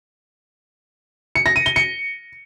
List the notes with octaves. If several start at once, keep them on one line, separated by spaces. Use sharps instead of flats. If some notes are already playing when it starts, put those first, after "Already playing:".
C#7
A#6
D#7
G7
C#7